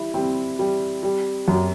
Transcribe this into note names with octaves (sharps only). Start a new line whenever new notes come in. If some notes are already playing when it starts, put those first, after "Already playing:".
Already playing: G3 E4
G3 C4
G3
G3
F#2